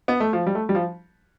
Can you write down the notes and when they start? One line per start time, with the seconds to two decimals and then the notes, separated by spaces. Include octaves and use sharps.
0.08 B3
0.20 A3
0.33 F3
0.47 G3
0.55 A3
0.69 G3
0.75 F3